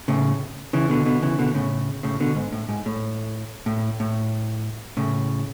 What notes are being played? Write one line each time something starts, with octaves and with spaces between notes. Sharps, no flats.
A2 C#3
C#3 E3
B2 D3
B2 D3
C#3 E3
B2 D3
A2 C#3
A2 C#3
B2 D3
G#2
A2
G#2
A2
A2
A2
A2 C#3